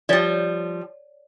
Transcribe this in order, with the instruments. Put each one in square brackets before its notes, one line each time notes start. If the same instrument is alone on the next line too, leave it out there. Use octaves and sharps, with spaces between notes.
[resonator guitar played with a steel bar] F3 G3 [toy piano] C#5 D5